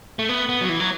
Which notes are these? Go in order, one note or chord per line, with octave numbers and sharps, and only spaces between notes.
A3
B3
B3
F#3
E3
F#3